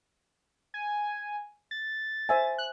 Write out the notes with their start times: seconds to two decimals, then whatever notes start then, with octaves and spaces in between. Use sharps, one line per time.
0.74 G#5
1.71 A6
2.29 C5 E5 G#5
2.58 F#6